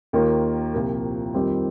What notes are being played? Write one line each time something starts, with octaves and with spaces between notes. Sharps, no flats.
D#2 D#3 A#3 F4
C2 A#2 F3 A#3
F2 D#3 G3 C4 G4